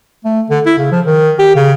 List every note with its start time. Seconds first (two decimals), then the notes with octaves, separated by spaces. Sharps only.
0.25 A3
0.50 D3
0.66 E4
0.78 C#3
0.91 F3
1.06 D#3
1.39 G4
1.55 C#3